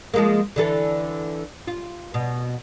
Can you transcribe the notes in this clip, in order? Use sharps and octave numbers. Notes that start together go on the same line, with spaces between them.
F3 G#3 A#3
D3 E3 A4
F4
B2